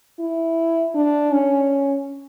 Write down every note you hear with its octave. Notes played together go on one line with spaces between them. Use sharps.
E4
D4
C#4